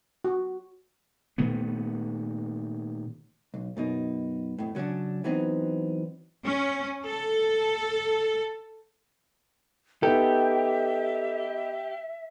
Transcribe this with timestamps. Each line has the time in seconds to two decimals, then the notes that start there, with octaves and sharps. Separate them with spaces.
0.25 F#4
1.38 A#2 D#3 A3 B3
3.54 B1
3.77 F#2 B2 D#4
4.59 F2 A2
4.75 C#3 F#3 G3 C#4 D4
5.24 E3 F#3 B3 C4 D4 D#4
6.45 C#4
7.05 A4
10.03 B3 D#4 G4 A4 E5